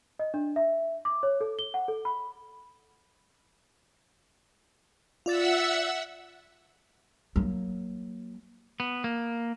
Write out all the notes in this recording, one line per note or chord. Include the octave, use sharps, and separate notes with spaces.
D#5
D4
E5
D6
C#5
A4
G7
F#5
A4
B5
F4 D5 E5 F#5 E6 A6
F#3 A#3
B3
A#3